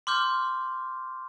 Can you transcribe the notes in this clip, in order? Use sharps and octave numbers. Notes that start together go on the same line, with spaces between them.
C6 D6 F6 G6